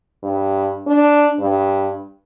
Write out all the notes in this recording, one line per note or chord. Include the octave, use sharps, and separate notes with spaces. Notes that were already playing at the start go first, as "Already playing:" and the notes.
G2
D4
G2